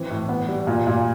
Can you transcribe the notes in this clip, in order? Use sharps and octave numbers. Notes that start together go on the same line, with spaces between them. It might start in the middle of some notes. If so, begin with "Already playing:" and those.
Already playing: E3 C4
A2
B3
G3
A#2
A#2